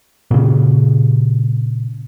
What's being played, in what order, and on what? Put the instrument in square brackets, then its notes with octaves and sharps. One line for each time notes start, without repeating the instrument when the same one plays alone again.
[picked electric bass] A#2 C#3